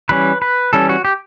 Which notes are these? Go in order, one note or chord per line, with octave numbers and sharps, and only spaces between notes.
E3 G3 C#4 B4
B4
E3 G3 C#4 A4
F#4
G4